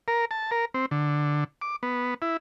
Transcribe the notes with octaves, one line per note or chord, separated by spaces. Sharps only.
A#4
A5
A#4
C4
D3
D6
B3
E4